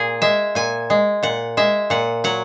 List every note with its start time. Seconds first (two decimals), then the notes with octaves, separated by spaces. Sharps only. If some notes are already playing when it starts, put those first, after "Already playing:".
Already playing: A#2 G#4
0.22 G#3 E5
0.55 A#2 G#5
0.90 G#3
1.23 A#2 F#5
1.57 G#3 E5
1.90 A#2 F#5
2.24 F#3 F#5